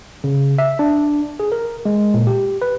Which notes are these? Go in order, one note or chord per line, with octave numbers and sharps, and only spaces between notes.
C#3
E5
D4
G#4
A#4
G#3
A#2
G4
B4